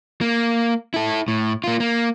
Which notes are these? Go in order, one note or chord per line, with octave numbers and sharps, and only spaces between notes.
A#3
E4 A4
A2
A#3 F4
A#3